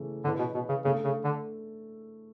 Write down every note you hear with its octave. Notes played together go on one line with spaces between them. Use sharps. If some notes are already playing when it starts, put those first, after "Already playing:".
Already playing: C#3 E3 A3 A4
D3 E3 G#3 C#4 E4 B4
B2
B2
C#3
C#3 A3 D4 A4
C#3
D3